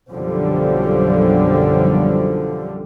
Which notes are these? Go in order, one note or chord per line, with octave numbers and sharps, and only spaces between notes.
B1 F#2 D3 F3 G3